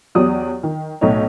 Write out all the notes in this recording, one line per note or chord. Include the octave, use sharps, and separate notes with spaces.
E2 F#3 G4 C#5 D5 D#6
D#3
B1 A2 D#4 C#5